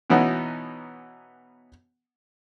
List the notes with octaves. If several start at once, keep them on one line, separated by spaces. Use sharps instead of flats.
B2 E3 B3 C#4 D#4 F#4